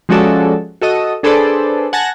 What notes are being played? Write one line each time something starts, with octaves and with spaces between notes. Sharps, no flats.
F3 G#3 C#4 F#4 A4 D5
F#4 A4 D#5 D#6
D4 G#4 A4 B4 C5 D5
F#5 G#5 A5 A#6